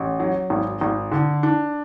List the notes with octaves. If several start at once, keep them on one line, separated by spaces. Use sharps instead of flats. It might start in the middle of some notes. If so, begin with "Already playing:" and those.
Already playing: A1
F#3
G#1
G#1
D3
D4